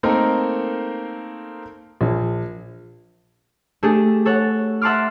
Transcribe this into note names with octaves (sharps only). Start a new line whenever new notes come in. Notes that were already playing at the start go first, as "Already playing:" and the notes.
A3 A#3 C4 D#4 A4 A#4
A#1
A3 D4 G4 G#4
A4 C#5 F#5
E5 F#5 A5 C6 D6 F6